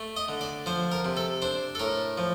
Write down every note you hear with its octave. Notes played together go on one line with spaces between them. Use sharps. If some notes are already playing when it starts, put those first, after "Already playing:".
Already playing: A3
D#5
D3
D5
F3 C5
A#4
C3
A4
D4 C5
A4
A2 A#4
F3